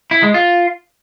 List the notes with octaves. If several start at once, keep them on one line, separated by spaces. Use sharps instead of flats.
E4
G#3
F4